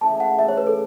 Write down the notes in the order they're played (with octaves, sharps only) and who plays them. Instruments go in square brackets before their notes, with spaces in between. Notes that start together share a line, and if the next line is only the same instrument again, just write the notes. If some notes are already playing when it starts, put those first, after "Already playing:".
[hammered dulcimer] C#3 E3 A3 [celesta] A5
[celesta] F#5
E5
C#5
B4
A4